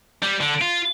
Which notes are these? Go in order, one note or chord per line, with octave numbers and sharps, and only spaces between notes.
G3
D3
F4